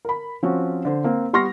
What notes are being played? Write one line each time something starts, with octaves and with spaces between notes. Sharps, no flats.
A#4 B5
F3 C4 C#4 F#4
D3 C5
A#3 C4
G3 B3 C6 C#6 F6 A#6